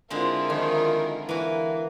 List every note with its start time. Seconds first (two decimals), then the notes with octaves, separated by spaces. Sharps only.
0.10 D3 G#3 C4 E4 F4 A#4
0.50 D#3 F3
1.29 E3 A#3 F#4